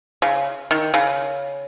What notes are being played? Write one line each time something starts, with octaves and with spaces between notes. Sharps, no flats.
C#3
D#3
C#3